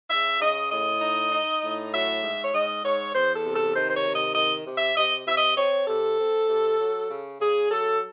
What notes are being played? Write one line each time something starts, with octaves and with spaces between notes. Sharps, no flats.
C#3 E5
C#3 D#5
A2 D#5
D#4
D#4
A2
F#3 E5
G#2
C#5
G#2 D#5
G#2 C#5
E2 C5
A4
C3
A4
D#3 C5
C5
C#5
C3
D#5
D#3 D#5
C3
E5
C3 D#5
C3 E5
D#5
C4 C#5
C3 A4
C4
C3
F#3
C#3
C#3 G#4
F#3 A4